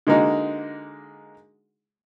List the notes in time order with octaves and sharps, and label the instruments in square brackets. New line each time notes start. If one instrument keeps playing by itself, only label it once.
[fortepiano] D3 G#3 A#3 D#4 F#4